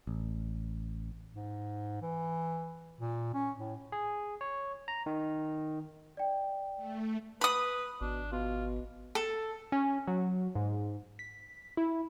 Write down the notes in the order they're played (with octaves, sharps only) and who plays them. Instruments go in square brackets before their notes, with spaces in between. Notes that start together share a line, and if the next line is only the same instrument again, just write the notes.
[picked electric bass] A1
[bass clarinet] G#2
E3
A#2
C#4
A2
[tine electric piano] G#4
C#5
A#5
D#3
[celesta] D5 G5
[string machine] A3
[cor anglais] B4 [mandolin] B5 D#6
[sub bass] G#1 [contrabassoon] B2 [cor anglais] D4
[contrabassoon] B2 [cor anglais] F4
[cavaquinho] A4
[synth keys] C#4
F#3
G#2
B6
E4